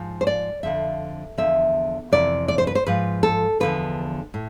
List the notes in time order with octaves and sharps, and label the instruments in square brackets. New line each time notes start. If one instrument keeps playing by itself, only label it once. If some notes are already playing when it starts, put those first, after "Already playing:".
Already playing: [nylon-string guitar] G#2 F3
C5
D5
F2 D3 F3 E5
E2 D3 F3 E5
F2 C3 E3 D5
D5
C5
B4
C5
G#2 F3 B4
A4
E2 D3 F3 B4
A2